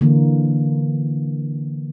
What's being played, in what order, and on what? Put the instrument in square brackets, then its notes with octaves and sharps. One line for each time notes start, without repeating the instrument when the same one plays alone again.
[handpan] D3 E3 A#3